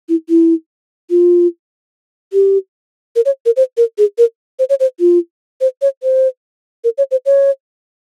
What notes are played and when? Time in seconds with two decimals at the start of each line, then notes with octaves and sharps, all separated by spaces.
0.09 E4
0.29 E4
1.10 F4
2.33 G4
3.16 A#4
3.26 C#5
3.46 A#4
3.56 C5
3.77 A#4
3.98 G#4
4.18 A#4
4.59 C5
4.69 C#5
4.80 C5
5.00 F4
5.61 C5
5.82 C#5
6.03 C5
6.84 A#4
6.98 C#5
7.11 C5
7.26 C#5